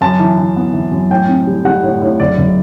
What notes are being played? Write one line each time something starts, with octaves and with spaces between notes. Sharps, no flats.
F#2 A5
E3
E3
B3
E3
F#2
A2 G5
C4
G3
G3 F#5
A2
A2
F#1 D5
F#1